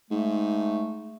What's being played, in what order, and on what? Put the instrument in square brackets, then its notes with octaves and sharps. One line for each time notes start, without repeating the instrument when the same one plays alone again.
[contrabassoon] G#2 [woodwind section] A3